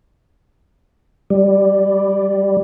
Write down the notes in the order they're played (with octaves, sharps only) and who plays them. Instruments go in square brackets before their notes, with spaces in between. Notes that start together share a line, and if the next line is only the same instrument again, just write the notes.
[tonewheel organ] G3